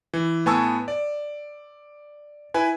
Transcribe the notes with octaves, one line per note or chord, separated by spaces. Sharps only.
E3
A2 B3 G#5 A5 C#6 E6
D5
E4 B4 G#5